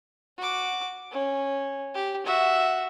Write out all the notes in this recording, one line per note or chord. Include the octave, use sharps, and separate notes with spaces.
F#4 D6
C#4
G4
F#4 E5